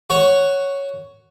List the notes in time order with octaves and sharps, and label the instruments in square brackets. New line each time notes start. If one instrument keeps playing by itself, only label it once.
[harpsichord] F#4 C#5